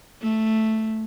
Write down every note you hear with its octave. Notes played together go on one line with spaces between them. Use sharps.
A3